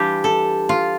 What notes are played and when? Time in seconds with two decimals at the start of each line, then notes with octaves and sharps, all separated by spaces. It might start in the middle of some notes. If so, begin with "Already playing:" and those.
Already playing: E3 G3 D4 F4 G4
0.24 A4
0.69 F4